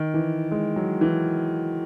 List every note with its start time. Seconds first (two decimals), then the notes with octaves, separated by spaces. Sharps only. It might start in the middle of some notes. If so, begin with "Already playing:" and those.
Already playing: D#3
0.14 E3
0.51 G#3
0.76 F#3
1.01 E3